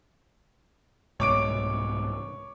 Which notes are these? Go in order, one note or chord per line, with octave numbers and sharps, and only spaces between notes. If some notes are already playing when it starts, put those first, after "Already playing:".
C2 G#2 B2 C#5 D6 D7